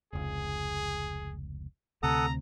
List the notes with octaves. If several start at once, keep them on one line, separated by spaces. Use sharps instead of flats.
F1 C#2 G#4
D2 C3 A4 F#5 A#5 D#6